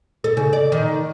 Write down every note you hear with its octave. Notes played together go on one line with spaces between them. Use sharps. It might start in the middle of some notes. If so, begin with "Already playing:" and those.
A4
C#3
D5
D#3